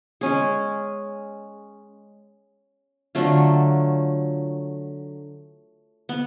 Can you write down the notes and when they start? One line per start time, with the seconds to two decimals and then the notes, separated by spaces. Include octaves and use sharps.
0.21 G#3 C#4 G#4
3.15 D3 F#3 A3 F4
6.09 B3